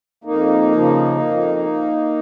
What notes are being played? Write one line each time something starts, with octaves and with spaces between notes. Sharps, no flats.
F2 A#3 D#4
C#3 F3
F2